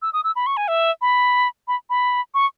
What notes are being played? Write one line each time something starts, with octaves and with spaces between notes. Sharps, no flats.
E6
D#6
E6
B5
C#6
G#5
E5
B5
B5
B5
C#6